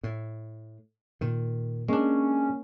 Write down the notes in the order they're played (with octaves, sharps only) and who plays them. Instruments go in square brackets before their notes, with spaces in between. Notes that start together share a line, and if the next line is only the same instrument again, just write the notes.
[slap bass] A2
A#2 D#3
[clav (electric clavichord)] G#3 D4 [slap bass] A#3 [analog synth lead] C#4